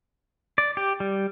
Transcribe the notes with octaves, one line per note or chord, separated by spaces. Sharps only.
D5
G4
G3